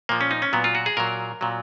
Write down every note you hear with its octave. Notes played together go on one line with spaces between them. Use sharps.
A#2 F3 A#3
C#4
D#4
C#4
A#2 F#3 B3
F4
F#4
G#4
A#2 F#3 A#4
A#2 F#3